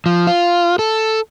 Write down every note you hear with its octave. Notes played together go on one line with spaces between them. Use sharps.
F3
F4
A4